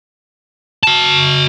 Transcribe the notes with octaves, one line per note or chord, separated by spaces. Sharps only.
F#4 A5